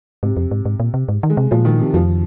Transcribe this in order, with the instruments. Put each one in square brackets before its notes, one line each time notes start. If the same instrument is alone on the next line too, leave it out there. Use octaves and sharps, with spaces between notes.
[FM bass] G#2 [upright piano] C3
[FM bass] F2
G#2
G#2
A#2
C3
G#2
D#3
[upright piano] G#3
[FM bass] C3
[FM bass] A#2 [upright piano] F3
[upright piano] D#3
C3
[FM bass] F2 [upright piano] F3